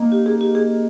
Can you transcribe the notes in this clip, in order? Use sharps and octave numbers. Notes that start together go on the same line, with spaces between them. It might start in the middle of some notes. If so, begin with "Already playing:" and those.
Already playing: A#3 D#4
G4
G#4
G4
G#4